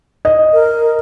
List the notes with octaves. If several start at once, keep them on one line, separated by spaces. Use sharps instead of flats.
D#5
A#4